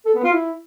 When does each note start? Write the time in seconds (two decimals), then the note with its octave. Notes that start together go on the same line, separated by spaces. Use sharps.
0.06 A4
0.15 B3
0.24 F4
0.33 E4